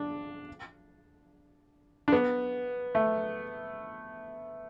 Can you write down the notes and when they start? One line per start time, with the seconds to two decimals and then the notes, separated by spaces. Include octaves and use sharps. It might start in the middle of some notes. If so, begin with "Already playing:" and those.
Already playing: D4
2.08 D4
2.12 B3
2.95 A3